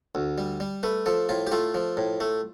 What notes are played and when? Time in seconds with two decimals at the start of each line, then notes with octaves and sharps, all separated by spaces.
0.15 D2
0.38 G3
0.60 G3
0.83 A3 B4
1.06 F3 A4
1.29 A2 F4
1.47 G4
1.51 A3 F4
1.74 F3
1.97 A2
2.20 A3